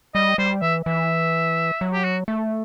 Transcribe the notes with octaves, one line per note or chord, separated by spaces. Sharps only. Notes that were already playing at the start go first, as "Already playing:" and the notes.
G3 D#5
G3 C5
E3 E5
E3 E5
F#3
G4
F#4
A3